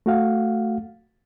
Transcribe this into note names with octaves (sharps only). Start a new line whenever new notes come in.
A3 F#4 F5 F#5